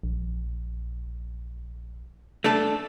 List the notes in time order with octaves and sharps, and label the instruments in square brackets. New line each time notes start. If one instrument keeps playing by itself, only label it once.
[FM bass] A#1
[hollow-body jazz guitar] A3 D4 A4